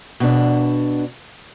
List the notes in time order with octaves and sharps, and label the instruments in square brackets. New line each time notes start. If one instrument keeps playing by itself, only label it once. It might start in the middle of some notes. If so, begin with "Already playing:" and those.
[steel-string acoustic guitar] B2 D4